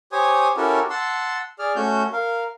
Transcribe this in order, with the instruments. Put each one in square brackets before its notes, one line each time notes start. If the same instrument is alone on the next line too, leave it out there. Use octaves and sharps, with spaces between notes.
[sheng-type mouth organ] G4 C5 C#5 G#5 D#6
C#4 E4 F#4 G4 A4 A#4
F#5 A5 C6 E6
G#4 D5 F6
A3 C#4 F#4 G6
A#4 F5